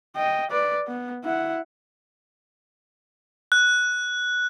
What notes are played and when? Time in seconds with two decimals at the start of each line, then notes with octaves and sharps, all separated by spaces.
0.16 D#5 G5
0.51 B4 D5
0.87 B3
1.24 E4 F#5
3.52 F#6